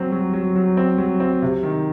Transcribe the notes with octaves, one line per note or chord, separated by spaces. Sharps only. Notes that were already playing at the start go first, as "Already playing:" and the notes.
Already playing: F#3 C4
F#3
F#3
F#3
C4
F#3
C4
C3
D#3